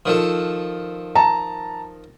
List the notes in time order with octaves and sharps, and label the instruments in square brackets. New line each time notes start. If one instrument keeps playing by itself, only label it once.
[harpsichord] D#3 F3 A4
[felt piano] A5 A#5